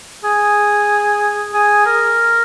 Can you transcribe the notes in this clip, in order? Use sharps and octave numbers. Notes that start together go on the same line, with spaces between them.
G#4
G#4
A#4